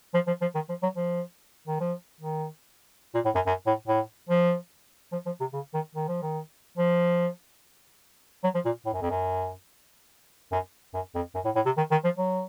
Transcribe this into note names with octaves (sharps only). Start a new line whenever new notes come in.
F3
F3
F3
D#3
F3
F#3
F3
D#3
F3
D#3
A#2
A2
F#2
F#2
A2
A2
F3
F3
F3
C3
C#3
D#3
D#3
F3
D#3
F3
F#3
F3
A#2
A2
F#2
F2
F#2
F#2
F#2
F2
F#2
A2
A2
C3
D#3
D#3
F3
F#3